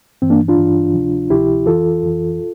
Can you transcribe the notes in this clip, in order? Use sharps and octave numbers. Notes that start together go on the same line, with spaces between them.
G2 E3 C4
A#3 D4
D4 F4
G2 E3
D2 C3 F3
D2 C3 F3 E4 G4
F2 E3 F4 A4
F2 E3